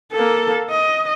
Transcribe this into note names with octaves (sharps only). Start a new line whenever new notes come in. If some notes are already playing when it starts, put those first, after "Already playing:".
A#3 A4
D#5